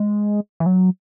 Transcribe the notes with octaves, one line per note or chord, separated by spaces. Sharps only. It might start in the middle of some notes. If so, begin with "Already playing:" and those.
Already playing: G#3
E3
F#3